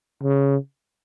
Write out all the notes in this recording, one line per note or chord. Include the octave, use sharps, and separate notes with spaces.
C#3